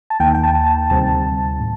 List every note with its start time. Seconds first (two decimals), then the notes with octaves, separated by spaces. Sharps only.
0.10 A5
0.20 D#2 D#3 A#3 G5
0.35 G5
0.43 A5
0.67 A5
0.90 D2 C3 D#3 G3 C4 A5
1.60 A2